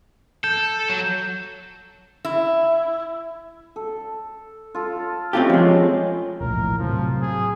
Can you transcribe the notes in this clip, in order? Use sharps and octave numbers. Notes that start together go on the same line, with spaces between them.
A4 G6
F#3
E4
A4
F4 A4
A3 C4 C#4 F4 G4 D#5
F3 G#3 C#5 G#5
E1 A#1 A2 A#4
A2 C3 F3 F#3
G#4